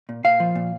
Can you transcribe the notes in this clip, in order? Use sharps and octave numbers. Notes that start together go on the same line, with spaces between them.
A#2
A#2 F5
F3
A#2